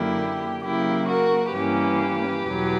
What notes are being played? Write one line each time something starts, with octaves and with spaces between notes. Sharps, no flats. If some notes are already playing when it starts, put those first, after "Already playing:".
Already playing: F#2 D3 A#3 E4 G4
C#3 F#3 A#3 E4 G4
F#4 A#4
G2 E3 A#3 C#4 G4 B4
E2 B2 F#3